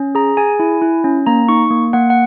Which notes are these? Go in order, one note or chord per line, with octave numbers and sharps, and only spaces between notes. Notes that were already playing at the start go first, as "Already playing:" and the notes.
Already playing: C#4
G#4 A#5
G#4 G#5
E4
E4
C#4
A#3 A#5
D#4 C#6
A#3
A#3 F#5
F#5